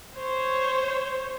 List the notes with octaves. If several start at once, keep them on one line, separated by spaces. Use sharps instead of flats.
C5 C#5